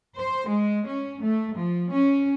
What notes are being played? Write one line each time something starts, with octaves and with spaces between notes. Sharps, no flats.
C5
G#3
C#4
A3
F3
C#4